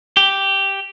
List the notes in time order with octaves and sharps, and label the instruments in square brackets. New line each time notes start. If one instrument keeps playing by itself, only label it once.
[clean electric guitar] G4